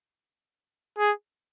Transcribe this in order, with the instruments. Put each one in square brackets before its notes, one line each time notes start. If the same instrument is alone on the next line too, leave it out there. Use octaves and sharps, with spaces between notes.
[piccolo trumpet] G#4